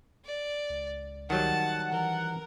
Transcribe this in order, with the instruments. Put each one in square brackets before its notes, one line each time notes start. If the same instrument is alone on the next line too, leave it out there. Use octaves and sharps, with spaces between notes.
[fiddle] D5
[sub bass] C#2
[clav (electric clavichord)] D#3 F#3 G3 [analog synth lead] F#5 [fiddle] A5
[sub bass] E3 [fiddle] A#4